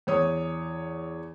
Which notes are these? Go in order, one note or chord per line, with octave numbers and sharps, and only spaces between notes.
E2 C#5 D#6